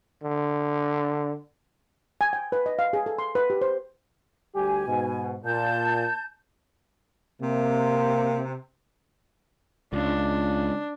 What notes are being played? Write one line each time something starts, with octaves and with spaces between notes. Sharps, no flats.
D3
G#5
G5
B4
D#5
F5
G#4
A4
C6
B4
G4
C5
D2 G3 G4 G#5
G#2 B2
A#2 A5 G6
C3 A#3
C#2 D4